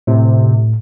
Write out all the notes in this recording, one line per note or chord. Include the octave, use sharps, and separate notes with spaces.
A2 C3